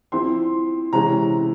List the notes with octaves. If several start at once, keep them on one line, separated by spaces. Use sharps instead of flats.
F3 C4 E4 C6
C3 E3 G#3 C#4 A#5